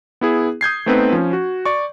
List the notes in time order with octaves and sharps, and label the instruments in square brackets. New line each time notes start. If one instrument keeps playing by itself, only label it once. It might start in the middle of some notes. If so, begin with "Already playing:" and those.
[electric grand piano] B3 E4 G#4
D#6 G6 G#6 C7
A3 B3 C4 D#4 A4 B4
F3 C#4
F#4
D5 C#6